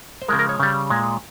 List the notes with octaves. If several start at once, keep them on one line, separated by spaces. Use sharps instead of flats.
C5
C#3 F3 G#3 A#4
A#4
C#5
C#3 G3
A#2 G#3